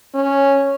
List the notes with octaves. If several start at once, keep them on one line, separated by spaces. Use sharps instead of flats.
C#4